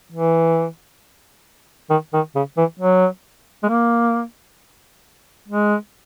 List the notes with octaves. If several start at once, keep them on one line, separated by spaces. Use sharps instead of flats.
E3
D#3
D#3
C#3
E3
F#3
G#3
A#3
G#3